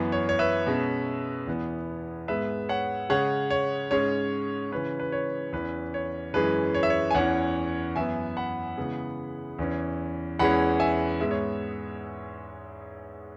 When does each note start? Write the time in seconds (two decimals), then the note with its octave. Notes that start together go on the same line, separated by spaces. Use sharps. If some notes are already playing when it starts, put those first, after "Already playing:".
Already playing: F#2 E3 B3
0.12 C#5
0.29 C#5
0.39 B4 E5
0.67 B2 G#3 C#4
1.47 E2 E3 B3
2.28 G#2 G#3 B3 B4 E5
2.69 C#5 F#5
3.09 C#3 G#3 C#4 C#5 F#5
3.50 C#5
3.91 G#2 G#3 C#4 C#5
4.72 C#3 E3 C#4 B4
5.00 B4
5.12 C#5
5.53 E2 E3 C#4 B4
5.94 C#5
6.34 F#2 E3 G#3 C#4 B4
6.75 C#5
6.83 E5
6.90 C#5
7.11 G#5
7.15 E2 E3 C#4 C#5 F#5
7.96 F#2 E3 B3 E5 G#5
8.37 F#5 B5
8.78 C#3 E3 G#3 B3
9.59 E2 E3 C#4
10.39 E2 E3 G#3 C#4 F#5 B5
10.80 E5 G#5
11.20 G#2 G#3 B3 E5
11.31 C#5